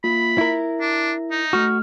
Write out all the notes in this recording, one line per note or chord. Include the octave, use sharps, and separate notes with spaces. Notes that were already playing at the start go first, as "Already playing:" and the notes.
A#3 F4 B5
E4 A#4 E5
D4
D#4
A3 F#4 F6